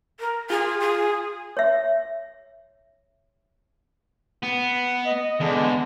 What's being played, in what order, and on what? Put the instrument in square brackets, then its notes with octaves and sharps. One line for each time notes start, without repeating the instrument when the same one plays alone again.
[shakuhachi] A#4
[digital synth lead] F4 [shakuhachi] G#4
[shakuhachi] G#4
[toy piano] C#5 E5
[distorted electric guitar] B3
[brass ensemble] D#5
[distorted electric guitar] E2 [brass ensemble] D3 G#3